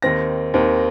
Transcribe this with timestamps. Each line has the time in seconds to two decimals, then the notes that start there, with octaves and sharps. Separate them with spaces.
0.02 D#2 D#3 C4 A#6
0.54 D#2 D#3 C4